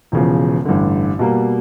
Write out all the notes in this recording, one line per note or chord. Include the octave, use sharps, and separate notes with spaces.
E1 E2 C#3 F3
A1 G2 D3
B2 G3 A#3